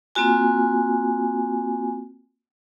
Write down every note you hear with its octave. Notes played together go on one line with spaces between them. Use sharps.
A#3 C4 F4 F#4 G#5